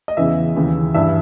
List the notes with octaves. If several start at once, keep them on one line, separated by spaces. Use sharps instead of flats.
D#5
E2 C#3 E3 E5
D#2 C#3 E3
G2 E3 E5